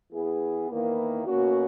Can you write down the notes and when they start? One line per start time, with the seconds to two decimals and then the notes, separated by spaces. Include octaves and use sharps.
0.13 E3 B3 E4 G#4
0.69 E2 D#3 A#3 E4 B4
1.25 B2 A#3 C#4 F#4